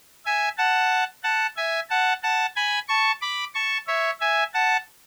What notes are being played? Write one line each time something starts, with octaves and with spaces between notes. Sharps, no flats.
E5 G#5
F#5 A5
F#5 A5
E5 G#5
F#5 A5
F#5 A5
G#5 B5
A5 C#6
B5 D6
A5 C#6
C#5 E5
E5 G#5
F#5 A5